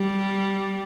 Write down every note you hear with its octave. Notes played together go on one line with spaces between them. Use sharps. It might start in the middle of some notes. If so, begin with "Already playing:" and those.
Already playing: G3